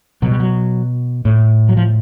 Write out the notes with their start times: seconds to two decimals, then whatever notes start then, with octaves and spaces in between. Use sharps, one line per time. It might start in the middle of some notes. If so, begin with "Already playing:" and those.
0.22 B2 F#3
0.31 G3
0.40 F#3
1.25 A2
1.69 F#3
1.77 F3